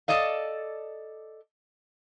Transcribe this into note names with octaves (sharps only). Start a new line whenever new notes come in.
A4 D5 D#5 F5